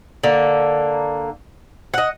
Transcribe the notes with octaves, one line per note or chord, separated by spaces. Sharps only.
D3 A#3
D#5 F#5